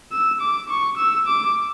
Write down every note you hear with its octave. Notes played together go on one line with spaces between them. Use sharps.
E6
D6
C#6
E6
D6